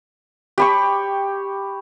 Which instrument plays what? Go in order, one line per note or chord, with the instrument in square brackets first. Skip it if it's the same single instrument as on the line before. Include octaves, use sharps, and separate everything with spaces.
[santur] G4 B5 C#6